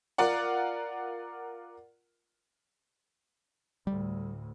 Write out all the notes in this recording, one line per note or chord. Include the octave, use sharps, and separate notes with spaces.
F4 A#4 D5 F#5
D2 A2 G3